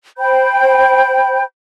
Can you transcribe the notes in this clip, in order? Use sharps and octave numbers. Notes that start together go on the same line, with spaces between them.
C5 G5 B5 G6